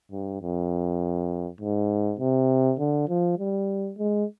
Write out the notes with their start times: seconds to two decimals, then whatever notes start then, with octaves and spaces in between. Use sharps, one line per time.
0.12 G2
0.41 F2
1.61 G#2
2.20 C3
2.79 D3
3.09 F3
3.39 G3
3.98 G#3